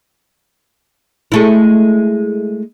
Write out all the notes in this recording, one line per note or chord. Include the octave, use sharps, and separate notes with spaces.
G#3 A3 E4